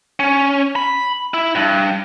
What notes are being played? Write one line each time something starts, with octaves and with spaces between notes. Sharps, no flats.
C#4
B5
E4
G2